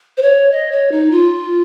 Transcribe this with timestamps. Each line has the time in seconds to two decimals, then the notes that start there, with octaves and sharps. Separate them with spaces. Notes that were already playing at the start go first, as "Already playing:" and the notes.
0.17 C5
0.22 C#5
0.52 D#5
0.72 C#5
0.92 D#4
1.11 F4